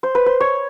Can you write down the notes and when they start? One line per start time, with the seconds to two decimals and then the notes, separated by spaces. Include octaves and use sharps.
0.03 C5
0.15 B4
0.26 C5
0.40 C#5